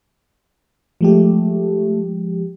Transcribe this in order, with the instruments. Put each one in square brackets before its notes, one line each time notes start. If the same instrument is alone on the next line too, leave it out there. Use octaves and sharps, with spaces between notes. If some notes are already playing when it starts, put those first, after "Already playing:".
[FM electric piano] F3 G#3 G4 [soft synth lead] A3